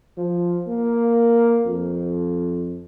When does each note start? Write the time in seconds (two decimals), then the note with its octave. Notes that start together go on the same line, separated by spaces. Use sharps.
0.17 F3
0.68 A#3
1.67 F2